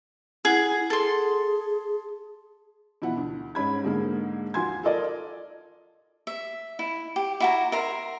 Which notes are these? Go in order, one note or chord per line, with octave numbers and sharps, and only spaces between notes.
E4 G#4 F#5
G#4 A4 C6
B2 E3 F3 E4 F#5
D2
G#2 C#4 B5 G#6
G#2 D3 G#3 A#3
D#2 F3 F#4 G#5 C6 G#6
F4 A4 A#4 D5 D#5
E5
E4
G4
E4 F#4 A#5
A#4 E5 A#5 C6